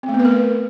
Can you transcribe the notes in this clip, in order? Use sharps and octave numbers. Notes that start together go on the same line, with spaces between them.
C4
A3
B3
B4
A#4